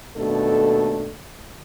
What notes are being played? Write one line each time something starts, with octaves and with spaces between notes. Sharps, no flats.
D#2 B2 A3 D4 A4